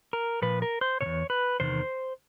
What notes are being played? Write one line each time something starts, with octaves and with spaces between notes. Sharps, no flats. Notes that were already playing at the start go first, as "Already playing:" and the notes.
A#4
A#2 F3 B4
A#4
C5
B2 C#5
E2
B4
E2 C3 D#3 C5